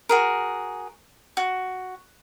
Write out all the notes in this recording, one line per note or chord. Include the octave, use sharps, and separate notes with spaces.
F#4 G#4 A#4
F#4